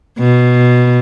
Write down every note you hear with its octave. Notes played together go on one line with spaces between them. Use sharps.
B2